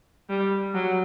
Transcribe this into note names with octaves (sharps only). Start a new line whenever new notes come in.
G3
F#3